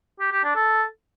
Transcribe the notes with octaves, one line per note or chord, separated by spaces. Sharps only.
G4
G4
D4
A4